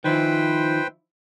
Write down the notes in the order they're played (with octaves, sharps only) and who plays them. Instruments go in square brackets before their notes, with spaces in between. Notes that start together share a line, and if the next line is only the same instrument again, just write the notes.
[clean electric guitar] D#3 F3 E4 [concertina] B4 C5 G5